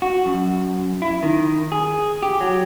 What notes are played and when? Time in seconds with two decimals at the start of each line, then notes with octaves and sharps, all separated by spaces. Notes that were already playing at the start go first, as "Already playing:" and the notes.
0.02 F#4
0.26 F#2
1.02 E4
1.23 D#3
1.72 G#4
2.23 G4
2.41 F#3